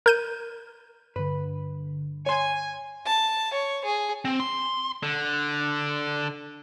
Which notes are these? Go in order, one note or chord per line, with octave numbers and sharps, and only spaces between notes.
A#4 G6 D#7
G2 D3 B4
C#5 G#5 C6
A5
C#5
G#4
C4
C6
D3